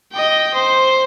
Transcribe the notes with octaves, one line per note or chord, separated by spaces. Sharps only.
D#5 G5
C5